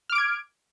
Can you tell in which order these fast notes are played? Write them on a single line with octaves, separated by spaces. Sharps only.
F6 D6 D7 G#6